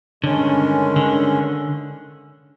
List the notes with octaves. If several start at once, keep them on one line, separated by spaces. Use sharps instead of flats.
G2 D3 D#3 G#3 C#4
D3